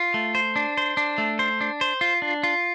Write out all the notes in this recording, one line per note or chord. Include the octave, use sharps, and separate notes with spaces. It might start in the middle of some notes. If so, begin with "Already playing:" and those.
Already playing: F4
A3
C5
D4
C5
D4
A3
C5
D4
C5
F4
D4
F4